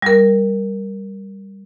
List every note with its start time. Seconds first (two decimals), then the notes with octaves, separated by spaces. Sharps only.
0.02 G3 A#4